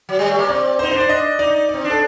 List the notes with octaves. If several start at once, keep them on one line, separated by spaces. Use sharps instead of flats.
F#3
G3
A3
A#3
C4 D5
C5
D#4
D4 C5
D5
D#5
D#4 D5
C4 D5
D4
A4